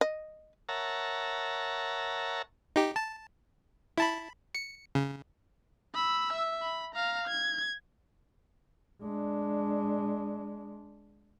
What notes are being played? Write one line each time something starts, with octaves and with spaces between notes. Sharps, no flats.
D#5
A#4 C#5 E5 F#5 A5 A#5
D#4 G4
A5
E4 A5 B5
C#7
C#3
B5 E6
E5
B5
F5 A#5
G#6
G#3 D4